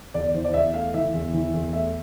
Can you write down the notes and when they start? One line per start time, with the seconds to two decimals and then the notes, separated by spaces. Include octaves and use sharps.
0.14 E2 D5
0.34 E3 C5
0.45 D5
0.54 E2 E5
0.74 A3 F5
0.94 E3 E5
1.14 E2
1.34 E3
1.54 E2
1.73 A3 E5